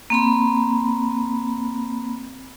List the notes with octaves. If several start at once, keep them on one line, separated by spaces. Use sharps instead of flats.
A#3 C4 B5